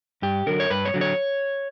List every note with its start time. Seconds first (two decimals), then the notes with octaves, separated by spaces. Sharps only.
0.22 G2 G4
0.47 D3 F#3 A#4
0.60 C#5
0.70 G2 B4
0.85 C#5
0.94 D3 F#3
1.01 C#5